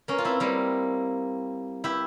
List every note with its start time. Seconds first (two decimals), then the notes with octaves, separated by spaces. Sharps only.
0.08 A#3 C#4
0.18 F4
0.25 C4 E4
0.40 G3 A#3
1.84 E4 G4